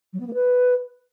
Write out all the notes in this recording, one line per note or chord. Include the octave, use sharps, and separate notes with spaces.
F#3
B3
A#3
B4